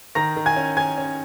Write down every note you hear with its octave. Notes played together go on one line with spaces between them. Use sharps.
D#3 A#5 A#6
D#3
G#5 G#6
C#4
D#3 G#5 G#6
C#4